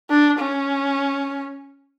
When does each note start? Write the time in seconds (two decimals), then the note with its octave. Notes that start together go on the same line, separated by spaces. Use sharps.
0.10 D4
0.39 C#4